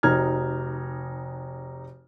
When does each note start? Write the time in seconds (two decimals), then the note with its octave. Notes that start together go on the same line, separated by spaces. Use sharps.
0.03 F1 D#4 F#4 F6 G#6